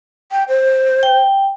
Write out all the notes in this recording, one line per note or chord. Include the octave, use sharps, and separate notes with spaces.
G5
C5
G5